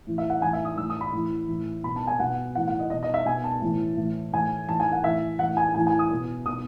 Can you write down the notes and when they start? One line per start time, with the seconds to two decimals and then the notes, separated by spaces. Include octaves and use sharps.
0.07 A2 E3
0.18 E5
0.30 F#5
0.42 A2 E3 G#5
0.53 E5
0.65 D#6
0.77 A2 E3 E6
0.90 D#6
1.01 B5
1.13 A2 E3
1.48 A2 E3
1.84 B2 B5
1.96 A5
2.07 G#5
2.20 B2 F#5
2.55 A2 E3 F#5
2.68 F#5
2.79 D#5
2.90 B2 D#5
3.03 D#5
3.14 E5
3.26 B2 G#5
3.44 A5
3.62 A2 E3
3.97 A2 E3
4.33 A2 E3 G#5
4.69 A2 E3 A5
4.80 G#5
4.92 F#5
5.04 A2 E3 E5
5.39 E3 F#5
5.42 A2
5.57 G#5
5.75 A2 E3 G#5
5.87 G#5
5.99 D#6
6.11 B2
6.46 B2 D#6